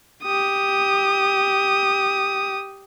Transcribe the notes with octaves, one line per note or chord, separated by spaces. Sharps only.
G4 D#6